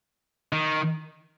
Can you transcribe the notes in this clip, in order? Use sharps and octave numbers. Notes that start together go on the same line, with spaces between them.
D#3